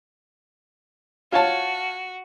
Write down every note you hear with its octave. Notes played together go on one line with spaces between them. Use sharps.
F4 F#4 C#5 A5